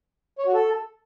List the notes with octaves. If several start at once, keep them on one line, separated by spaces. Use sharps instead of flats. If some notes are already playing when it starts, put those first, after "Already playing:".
C#5
F#4
A4